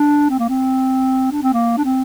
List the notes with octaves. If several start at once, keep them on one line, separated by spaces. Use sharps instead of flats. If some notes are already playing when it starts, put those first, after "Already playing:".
Already playing: D4
C4
A#3
C4
D4
C4
A#3
D4
C4